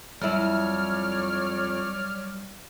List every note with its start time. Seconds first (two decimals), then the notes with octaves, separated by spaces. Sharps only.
0.21 F2 F#3 G3 E4 C#5 D5 F6